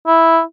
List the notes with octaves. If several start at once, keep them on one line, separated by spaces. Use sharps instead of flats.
E4